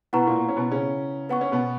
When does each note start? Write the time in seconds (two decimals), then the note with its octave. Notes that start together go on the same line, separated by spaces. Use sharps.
0.13 B2 B3 E4 B4 F#5 A#5 C#6
0.27 A#2 A#3
0.49 C#4
0.56 B2 B3
0.71 C#3 C#4
1.29 B3 B4 F#5 C#6
1.41 C#4
1.52 B2 B3